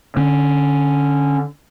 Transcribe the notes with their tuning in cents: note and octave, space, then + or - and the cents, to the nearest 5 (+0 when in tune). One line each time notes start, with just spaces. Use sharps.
D3 +0 C#4 +0